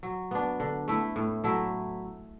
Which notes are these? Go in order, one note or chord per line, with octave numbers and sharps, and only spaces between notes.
F#3
B3 D4
D3
A3 E4
A2
F#3 A3 E4